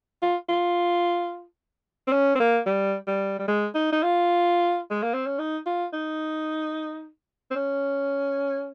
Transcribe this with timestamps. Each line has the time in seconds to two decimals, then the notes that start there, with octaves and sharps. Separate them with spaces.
0.22 F4
0.49 F4
2.07 C4
2.12 C#4
2.35 C4
2.40 A#3
2.66 G3
3.07 G3
3.39 G3
3.48 G#3
3.75 D#4
3.92 D#4
4.03 F4
4.90 G#3
5.02 A#3
5.14 C4
5.26 C#4
5.39 D#4
5.66 F4
5.93 D#4
7.51 C4
7.56 C#4